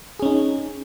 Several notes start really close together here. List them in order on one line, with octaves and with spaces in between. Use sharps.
G#4 C#4 D#4